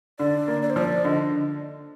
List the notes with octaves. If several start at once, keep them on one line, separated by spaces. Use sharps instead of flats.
D3 D5
A#3
D5
C5
F3 D5
D3 D#5